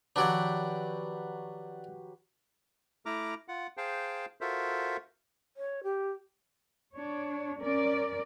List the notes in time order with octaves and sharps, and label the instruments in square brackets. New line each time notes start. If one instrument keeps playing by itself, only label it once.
[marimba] D#3 F3 [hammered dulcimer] F#3 G4 B4 [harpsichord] D4 D5 F#5
[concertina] A3 E4 A#5 D6 F6
F4 F#5
G#4 C5 F5 G5 A5
F4 F#4 A4 A#4 C5 E5
[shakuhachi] C#5
G4
[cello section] D4 C#5
C#4 A#4 D5